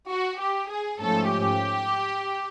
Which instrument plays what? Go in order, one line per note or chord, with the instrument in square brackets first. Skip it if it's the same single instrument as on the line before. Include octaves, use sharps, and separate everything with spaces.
[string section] F#4
G4
G#4
G#2 F3 A3 C#4 A4
G4